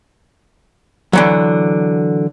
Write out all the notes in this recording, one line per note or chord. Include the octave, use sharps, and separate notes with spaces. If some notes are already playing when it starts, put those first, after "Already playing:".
D3 E3 F#3